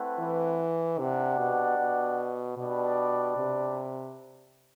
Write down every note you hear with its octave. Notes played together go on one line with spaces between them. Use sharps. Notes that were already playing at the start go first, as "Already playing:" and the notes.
Already playing: A3 C4 E4 B4 F#5
E3
C3 D4 G4 D5 F#5
B2
B2
B2 D4 G4 B4 D5
C3